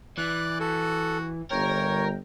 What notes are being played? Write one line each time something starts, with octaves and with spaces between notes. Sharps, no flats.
E3 D5 F#6
F#4 A4
G1 A#4 C#5 G5